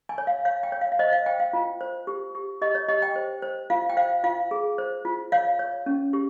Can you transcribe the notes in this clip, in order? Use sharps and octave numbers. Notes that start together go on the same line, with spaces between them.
G#5
C#5
F5
C#5 F5
G5
C#5
F5
F5
C5 D#5
F5
C5 G5
F5
F4
C5
G4
G4
G4 D#5
C#5
G4 D#5
G5
C5
C5
F4 F5
G5
C5 F5
F4 F5
G#4
C5
F4
C#5 F5
C#5
C#4
G4